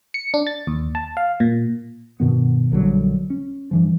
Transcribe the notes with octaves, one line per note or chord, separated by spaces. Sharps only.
C#7
D4
A6
D#2
A5
F5
A#2
G2 B2 D#3 B3
A#1 D3 F#3 G3
C#4
G2 E3 F3